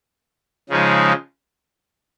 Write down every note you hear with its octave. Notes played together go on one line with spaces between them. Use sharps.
C#3 F3 G#3 D#4